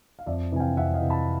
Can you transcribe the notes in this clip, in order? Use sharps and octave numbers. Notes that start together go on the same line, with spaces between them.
F5
F2 D5 E5
C3 E3 G#5
F5 G5
F2 E5 F#5
D#5 F5
C3 E3
A5 B5